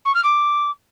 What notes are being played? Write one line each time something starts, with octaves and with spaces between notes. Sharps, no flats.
C#6
F6
D6